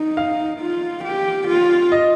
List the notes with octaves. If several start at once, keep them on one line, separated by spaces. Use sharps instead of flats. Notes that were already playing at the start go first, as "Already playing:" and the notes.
Already playing: D#4
F5
F4
G4
F4
D#5